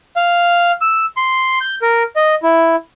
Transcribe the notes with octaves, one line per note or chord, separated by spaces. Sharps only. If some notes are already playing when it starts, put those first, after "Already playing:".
F5
E6
C6
G6
A#4
D#5
E4